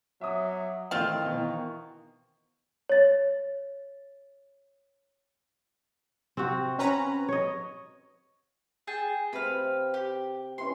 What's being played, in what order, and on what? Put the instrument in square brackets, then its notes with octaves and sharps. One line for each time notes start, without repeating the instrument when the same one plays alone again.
[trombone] F#3 [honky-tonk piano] E5 D6 D#6
[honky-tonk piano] A1 A3 [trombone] D#3 [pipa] C4 F4
[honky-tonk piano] B2 E3
[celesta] C#5 A6
[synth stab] C3 [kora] C4 F#4
[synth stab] C#4 B4 A#5
[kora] C#5 D#5
[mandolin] G#4 G5 A5
[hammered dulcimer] C3 [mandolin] B4 F5
[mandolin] G4
[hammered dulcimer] C#4 E4 B4 [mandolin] C6